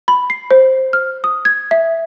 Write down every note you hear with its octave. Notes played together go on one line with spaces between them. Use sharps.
B5
C7
C5
F6
D#6
G#6
E5